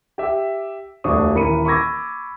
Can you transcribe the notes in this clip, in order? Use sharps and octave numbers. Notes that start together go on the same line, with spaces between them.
G4 E5
E1 D2 G3 D4 C#6 D#6
D#1 E3 A#4 B5 C#7 D#7
B5 C#6 D6 E6 G#6 A#6